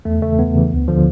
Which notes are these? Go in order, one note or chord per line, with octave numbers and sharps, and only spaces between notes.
E2 A3
C#3 E3 A3
E2 B3
C#3 E3
D2
D3 F3